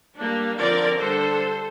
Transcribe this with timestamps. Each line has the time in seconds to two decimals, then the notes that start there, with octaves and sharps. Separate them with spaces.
0.16 G3 A#3 D4
0.58 D3 F3 C4 A#4 D5
1.00 D3 G3 D4 A4 C5